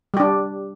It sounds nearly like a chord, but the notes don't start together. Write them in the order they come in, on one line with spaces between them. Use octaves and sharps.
G3 G4 D4